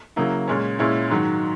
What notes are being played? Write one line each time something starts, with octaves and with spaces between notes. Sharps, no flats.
C#3 F#3 A#3 E4
A#2 G#3 C#4
A#2 G#3 C#4 E4
G#2 D#3 F#3